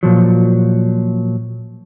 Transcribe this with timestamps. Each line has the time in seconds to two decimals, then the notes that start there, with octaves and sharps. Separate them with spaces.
0.03 A#2 F3 F#3